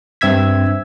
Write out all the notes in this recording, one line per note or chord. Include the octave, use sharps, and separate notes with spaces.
G2 C4 E5 E6 G#6 B6